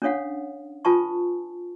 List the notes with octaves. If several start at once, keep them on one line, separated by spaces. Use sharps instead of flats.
C#4 D4 A4 C#5 F5 F#5
F4 A4 B4 G#5 A5 C#6